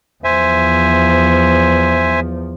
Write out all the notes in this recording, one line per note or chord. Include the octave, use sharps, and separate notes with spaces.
E2 F3 C5 E5 G#5